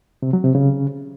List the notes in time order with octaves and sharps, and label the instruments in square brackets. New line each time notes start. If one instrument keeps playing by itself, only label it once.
[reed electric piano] C3
F#3
C3
C#3